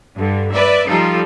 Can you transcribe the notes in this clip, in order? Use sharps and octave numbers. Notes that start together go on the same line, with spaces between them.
G2 D3
B4 D5 E5
F3 G3 D#4 F4 A4